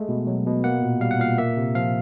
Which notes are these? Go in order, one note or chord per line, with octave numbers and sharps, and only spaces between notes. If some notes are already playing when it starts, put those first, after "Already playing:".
Already playing: G#3 A3
B2
F#3
B2
A#3 F#5
A#2
G3 F5
F#5
A#2 F5
A#3 E5
C3
F3 F5